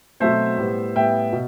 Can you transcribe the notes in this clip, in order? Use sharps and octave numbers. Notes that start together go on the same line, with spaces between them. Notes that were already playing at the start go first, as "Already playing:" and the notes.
B2 F#3 A3 C4 C5 E5
A2 G3 B3
A2 G3 B3 E5 G5
B2